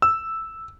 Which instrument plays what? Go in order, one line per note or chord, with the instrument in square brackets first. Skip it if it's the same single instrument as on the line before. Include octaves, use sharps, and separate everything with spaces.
[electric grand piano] E6